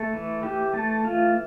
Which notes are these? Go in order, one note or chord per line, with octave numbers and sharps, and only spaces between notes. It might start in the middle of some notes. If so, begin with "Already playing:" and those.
Already playing: A3 A4
E3
E3 G4
A3 A4
E3 F4